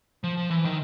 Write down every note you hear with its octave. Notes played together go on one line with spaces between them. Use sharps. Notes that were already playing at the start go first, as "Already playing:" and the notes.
F3
F3
E3
D#3